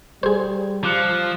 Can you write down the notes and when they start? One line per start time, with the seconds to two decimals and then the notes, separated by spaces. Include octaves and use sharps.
0.23 G3 G#4 C5
0.83 F3 D6 F#6 C#7